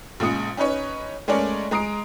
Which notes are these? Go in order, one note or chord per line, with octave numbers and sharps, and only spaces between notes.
A#1 C#3 G#3 D#6 C#7
C#4 D#4 B4 C#5
G#3 A3 C#4 A#4 C#5 D5
G#3 A#5 D#6 C7 D7